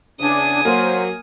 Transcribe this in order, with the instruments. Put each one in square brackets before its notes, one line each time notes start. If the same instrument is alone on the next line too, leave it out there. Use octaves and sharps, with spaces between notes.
[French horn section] E2 C#3 [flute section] D4 [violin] G#5 D#6
[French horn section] F#3 [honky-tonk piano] A#3 [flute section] C5